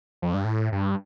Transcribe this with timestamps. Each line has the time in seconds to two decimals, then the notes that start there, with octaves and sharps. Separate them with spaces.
0.22 F2
0.34 G2
0.45 A2
0.72 G2